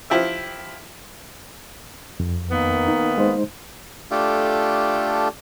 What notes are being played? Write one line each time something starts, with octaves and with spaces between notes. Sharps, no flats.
F3 E4 G4 E5
F2
D#3 A#3 B3
D#4
G#3 D#4 C5
A3 D4 F4 G4 A4